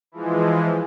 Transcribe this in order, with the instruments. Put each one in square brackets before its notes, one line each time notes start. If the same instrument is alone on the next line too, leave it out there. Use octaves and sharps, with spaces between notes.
[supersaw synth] E3 F3 G#3